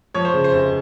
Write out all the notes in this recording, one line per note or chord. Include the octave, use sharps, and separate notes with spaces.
F3 C#5
C5
C#3
C5
F1